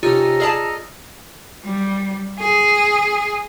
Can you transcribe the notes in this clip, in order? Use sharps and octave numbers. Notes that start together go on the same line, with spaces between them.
C3 C#4 D#4 F4 A4 D#5 A#5
G#4 D5 F5 A5
G3
G#4